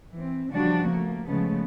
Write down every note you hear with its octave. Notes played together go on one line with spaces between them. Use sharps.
E3 C4
C#3 E3 F3 G3 D4 F#4
A3 A#3
C#3 F3 G#3 A3 B3